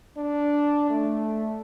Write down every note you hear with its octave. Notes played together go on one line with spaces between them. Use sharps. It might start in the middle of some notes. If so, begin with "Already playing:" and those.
D4
A3